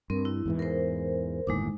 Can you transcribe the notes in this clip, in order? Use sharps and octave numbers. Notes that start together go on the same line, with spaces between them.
G2 C4 A#4
E4
E2 G#2 E3
A#4 C5
G1 D#2 A2 G#3 D#4 D6